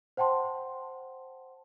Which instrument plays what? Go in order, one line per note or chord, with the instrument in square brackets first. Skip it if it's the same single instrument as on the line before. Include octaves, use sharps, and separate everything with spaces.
[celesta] C5 F#5 G5 A5 C6